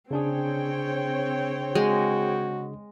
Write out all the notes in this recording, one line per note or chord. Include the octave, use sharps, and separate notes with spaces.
C#3 C4 D4 G#4 C#5 G5
G#3 F#4